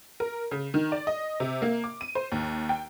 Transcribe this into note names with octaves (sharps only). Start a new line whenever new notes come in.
A#4
C#3
D#3
D5
D#5
C3
A#3
D6
D#7
C5
D#2
G5